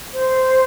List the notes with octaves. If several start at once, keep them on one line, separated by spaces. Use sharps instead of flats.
C5